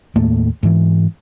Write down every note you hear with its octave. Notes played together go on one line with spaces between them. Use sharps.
D#2 A2 A3 A#3
G#2 E3